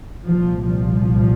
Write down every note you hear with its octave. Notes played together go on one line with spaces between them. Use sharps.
C2 A#2 F3
F3